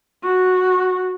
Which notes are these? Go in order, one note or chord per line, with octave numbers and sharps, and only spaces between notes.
F#4